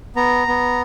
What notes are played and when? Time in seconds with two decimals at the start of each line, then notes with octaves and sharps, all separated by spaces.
0.16 B3 A#5
0.48 B3